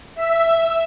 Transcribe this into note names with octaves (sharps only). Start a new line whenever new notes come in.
E5